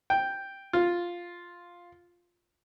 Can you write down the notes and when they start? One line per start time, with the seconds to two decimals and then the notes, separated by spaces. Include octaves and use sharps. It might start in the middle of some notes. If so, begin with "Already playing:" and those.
0.10 G5
0.73 F4